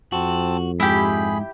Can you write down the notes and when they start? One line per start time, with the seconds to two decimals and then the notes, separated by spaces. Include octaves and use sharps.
0.12 F2 C4 F#4 A5
0.80 G#2 E4 G4 G#4 B5